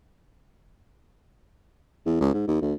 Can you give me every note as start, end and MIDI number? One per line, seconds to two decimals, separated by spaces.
2.06 2.17 40
2.21 2.32 37
2.34 2.44 44
2.48 2.60 39
2.62 2.74 38